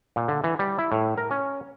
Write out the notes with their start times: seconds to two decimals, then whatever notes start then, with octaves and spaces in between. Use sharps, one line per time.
0.16 A#2
0.28 D3
0.44 E3
0.59 G3
0.79 E4
0.92 A2
1.18 A#4
1.31 C#4